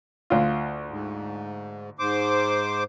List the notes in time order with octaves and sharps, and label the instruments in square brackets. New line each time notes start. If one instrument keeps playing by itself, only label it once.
[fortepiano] D2 F4
[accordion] G#2
G#2 C5 D6